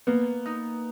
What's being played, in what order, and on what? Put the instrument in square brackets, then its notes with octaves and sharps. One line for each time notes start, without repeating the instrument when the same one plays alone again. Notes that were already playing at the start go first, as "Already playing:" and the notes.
[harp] A#3 [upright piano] B3
[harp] D#4